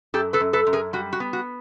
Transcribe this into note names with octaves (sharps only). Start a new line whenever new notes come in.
F#2 G4 A4
A4 B4
F#2
A4 B4
F#2
G#4 A#4
G3 F#4
F#4
B3
F#4